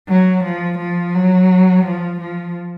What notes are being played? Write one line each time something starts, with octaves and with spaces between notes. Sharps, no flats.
F#3
F3
F3
F#3
F3
F3